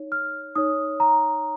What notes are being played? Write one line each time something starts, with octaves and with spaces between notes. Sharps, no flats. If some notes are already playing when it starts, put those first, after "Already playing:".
Already playing: D#4 C#5
F6
D#4 C#5 D#6
A#5